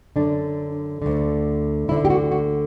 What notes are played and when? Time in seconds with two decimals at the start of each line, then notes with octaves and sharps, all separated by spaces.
0.16 F#2 D3 D4
1.02 D2 D3
1.88 D2 D3 E4
2.05 G4
2.10 F#4
2.32 F#4